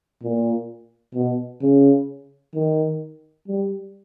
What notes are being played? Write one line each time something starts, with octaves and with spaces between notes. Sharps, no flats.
A#2
B2
C#3
D#3
G3